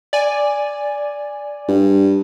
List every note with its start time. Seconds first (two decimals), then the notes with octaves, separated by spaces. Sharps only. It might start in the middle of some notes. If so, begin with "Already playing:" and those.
0.13 D5 G#5
1.68 G2